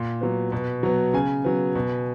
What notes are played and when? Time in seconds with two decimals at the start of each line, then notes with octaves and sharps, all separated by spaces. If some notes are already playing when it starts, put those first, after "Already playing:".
Already playing: A#2
0.21 F#3 B3
0.52 B2
0.83 F#3 B3
1.13 C#3 G#5
1.44 F#3 B3
1.75 B2